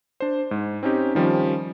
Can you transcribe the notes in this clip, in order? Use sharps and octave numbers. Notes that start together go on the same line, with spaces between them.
D4 C5
G#2
C4 C#4 D#4 G4
D#3 F3 G3 C#4